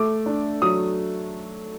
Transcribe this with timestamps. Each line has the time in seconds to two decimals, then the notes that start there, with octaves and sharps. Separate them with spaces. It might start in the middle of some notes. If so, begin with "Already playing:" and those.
Already playing: A3 D6
0.26 D4
0.62 F#3 D#6